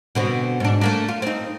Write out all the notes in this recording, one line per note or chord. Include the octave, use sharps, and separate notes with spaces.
B2 D3 C4
G#2 D4
A3 A#3 D4
F4
C4 D#4